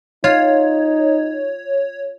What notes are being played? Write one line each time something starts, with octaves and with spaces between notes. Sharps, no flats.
D#4 F4 C#5